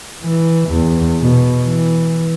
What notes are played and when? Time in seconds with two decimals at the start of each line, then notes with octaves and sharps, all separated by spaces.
0.23 E3
0.69 E2
1.21 B2
1.66 E3